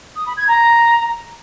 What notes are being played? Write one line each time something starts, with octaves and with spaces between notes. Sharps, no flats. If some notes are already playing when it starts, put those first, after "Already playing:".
D#6
B5
G#6
A#5